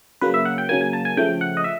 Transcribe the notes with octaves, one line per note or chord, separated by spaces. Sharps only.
C#3 F#3 A#3 B4
E5
F#5
G5
C#3 F#3 A#3 G#5
G#5
A5
G#5
C#3 F3 A3 G5
F#5
D#5
E5